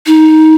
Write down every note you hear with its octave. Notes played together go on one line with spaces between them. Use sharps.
D#4